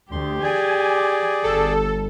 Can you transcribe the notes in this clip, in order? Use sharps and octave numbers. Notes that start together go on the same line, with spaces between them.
D2 G4 C6
G#4 D5 G#5
G1 A4